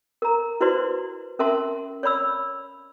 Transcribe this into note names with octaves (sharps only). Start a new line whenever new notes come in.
A#4 A#5
E4 F#4 B4 C5 D5 C6
C#4 A#4 E5 A5 C6
C#5 D5 B5 E6